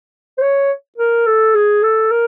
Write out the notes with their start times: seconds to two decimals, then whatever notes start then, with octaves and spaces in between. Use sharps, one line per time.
0.38 C5
0.42 C#5
0.98 A#4
1.26 A4
1.55 G#4
1.83 A4
2.11 A#4